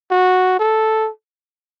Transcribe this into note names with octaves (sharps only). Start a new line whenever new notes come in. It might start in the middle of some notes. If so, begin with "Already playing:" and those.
F#4
A4